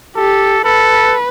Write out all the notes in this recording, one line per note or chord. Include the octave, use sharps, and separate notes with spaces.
G4 A4
A4 B4